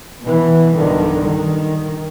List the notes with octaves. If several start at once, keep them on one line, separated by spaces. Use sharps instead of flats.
B2 E3
B1 G2 D3 D#3
D#3